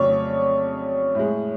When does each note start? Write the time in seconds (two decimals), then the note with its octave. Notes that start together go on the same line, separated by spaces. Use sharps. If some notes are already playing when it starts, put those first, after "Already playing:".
Already playing: F2 C#3 F#3 A3 C#5 D5
1.15 A2 G#3